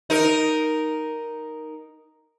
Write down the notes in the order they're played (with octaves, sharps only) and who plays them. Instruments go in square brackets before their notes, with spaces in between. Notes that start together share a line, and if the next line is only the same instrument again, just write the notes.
[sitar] D#4 A#4